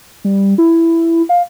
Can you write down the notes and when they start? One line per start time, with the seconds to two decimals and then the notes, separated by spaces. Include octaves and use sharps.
0.24 G3
0.58 E4
1.29 F5